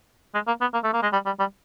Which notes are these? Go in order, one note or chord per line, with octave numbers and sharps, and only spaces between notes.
G#3
A#3
B3
A#3
A3
A#3
G#3
G3
G3
G3